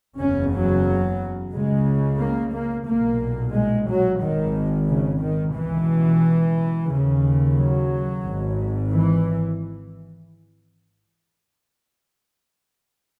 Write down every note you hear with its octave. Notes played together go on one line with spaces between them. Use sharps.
F#1 E2 C#3 C#4
F#3
C#2 C#3 G#3
A#3
A#3
B1 A#2 A#3
G#3
F#3
G#1 G#2 D#3
C#3
D#3
C#2 B2 E3
D#2 C#3
F#3
G#1 G#2
E3